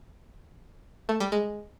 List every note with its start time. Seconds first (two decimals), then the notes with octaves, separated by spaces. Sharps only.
1.09 A3
1.20 G3
1.32 G#3